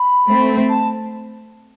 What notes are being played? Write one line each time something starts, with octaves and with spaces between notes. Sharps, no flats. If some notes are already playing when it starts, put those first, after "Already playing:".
Already playing: B5
A3 C4
A5